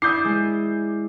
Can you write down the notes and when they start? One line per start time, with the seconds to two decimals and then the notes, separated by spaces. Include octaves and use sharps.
0.02 E4 D5 D6 D#6 G6 C7
0.25 G#3